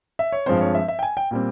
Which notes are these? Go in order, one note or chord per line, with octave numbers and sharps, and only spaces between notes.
E5
C#5
G2 F3 G#3 C4 C5
C#5
E5
E5
G5
G#5
G5
A#2 G3 C4